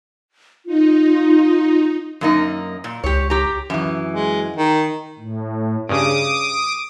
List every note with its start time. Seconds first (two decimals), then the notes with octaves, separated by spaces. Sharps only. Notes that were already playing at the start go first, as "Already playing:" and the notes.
0.66 D#4 F4
2.21 F#2 A#3 D#4
2.84 A#2
3.04 C#2 G4 C#5
3.30 G4 A#5
3.70 F#2 E3
4.12 G#3
4.57 D#3
5.19 A2
5.89 G2 C#3 D6 D#6